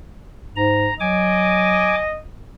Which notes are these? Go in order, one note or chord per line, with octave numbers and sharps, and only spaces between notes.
G#2 A#5
F#3 D#5 G#5 D6